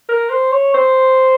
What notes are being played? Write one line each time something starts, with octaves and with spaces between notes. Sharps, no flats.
A#4
C5
C#5
C5